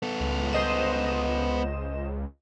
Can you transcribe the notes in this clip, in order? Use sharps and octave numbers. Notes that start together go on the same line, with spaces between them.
B3 A4
C#2
C5 D#5 E7